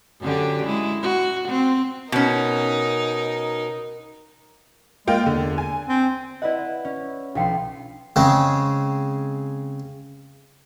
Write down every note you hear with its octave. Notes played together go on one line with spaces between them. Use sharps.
F#2 D3 G4
G#3 E4
F#4
C4
B2 C#4 D#4 A#4
G#3 A#3 F4 G5
E2 D3
G#5
C4
E4 B4 D5 D#5 F#5
C#4 D5
B1 F3 D4 F5 G5 C6
C#3 G#3 C4